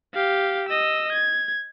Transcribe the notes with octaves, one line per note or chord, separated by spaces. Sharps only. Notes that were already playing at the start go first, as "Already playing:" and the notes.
G4 F5
D#5 E6
G#6